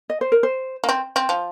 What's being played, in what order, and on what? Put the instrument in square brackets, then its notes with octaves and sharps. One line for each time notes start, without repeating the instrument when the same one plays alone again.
[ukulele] D#5
C5
A#4
C5
[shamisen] A#3
C4
C4
F3